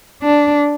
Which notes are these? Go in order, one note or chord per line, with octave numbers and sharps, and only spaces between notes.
D4